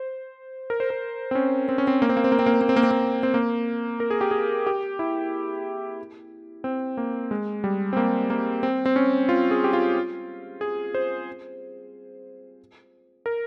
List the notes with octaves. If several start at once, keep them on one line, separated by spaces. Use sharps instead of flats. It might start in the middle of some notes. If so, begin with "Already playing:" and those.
Already playing: C5
A#4
C5
A#4
C4
C#4
C4
C#4
C4
A#3
C4
A#3
C4
A#3
C4
A#3
C4
A#3
C4
A#3
C4
A#3
C4
A#3
A#4
G#4
G4
G#4
G4
E4
C4
A#3
G#3
G3
C4
A#3
A#3
C4
C4
C#4
F4
G#4
G4
F4
G#4
C5
A#4